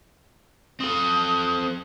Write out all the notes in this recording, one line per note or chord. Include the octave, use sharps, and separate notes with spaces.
C4 A4 D#6